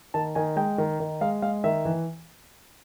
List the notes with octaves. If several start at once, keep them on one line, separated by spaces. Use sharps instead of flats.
D#3 A5
D#3 G#5
G#3 G5
D#3
D#3
G#3 F5
G#3 F5
D#3 E5
E3